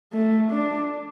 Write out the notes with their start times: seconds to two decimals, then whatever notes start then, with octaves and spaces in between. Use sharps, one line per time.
0.13 A3
0.51 D4